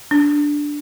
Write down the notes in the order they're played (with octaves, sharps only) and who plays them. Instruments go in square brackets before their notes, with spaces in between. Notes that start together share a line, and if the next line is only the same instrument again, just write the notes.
[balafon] D4